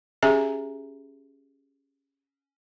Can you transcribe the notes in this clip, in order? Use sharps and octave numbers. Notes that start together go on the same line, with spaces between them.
C#4 G4 G#4 E5 G#5 A#5